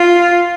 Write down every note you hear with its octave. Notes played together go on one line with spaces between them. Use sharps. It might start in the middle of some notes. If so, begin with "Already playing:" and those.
Already playing: F4